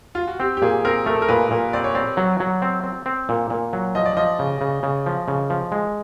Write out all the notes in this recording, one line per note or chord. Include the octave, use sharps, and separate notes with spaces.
F4
F#4
C4 G4
G4
A#2 G#4
C4 A#4
A3 A#4
A4
A#4
A#2 B4
A#2
C4 D5
C#5
C4 D5
F#3
F#3
C4
C4
C4
A#2
A#2
F#3
F3 D#5
D5
F3 D#5
C#3
C#3
C#3
F3
C#3
F3
G#3